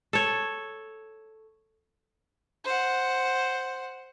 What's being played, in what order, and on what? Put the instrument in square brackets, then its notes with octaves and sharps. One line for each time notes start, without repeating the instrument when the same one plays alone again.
[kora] A4 C#5
[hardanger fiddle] C5 F#5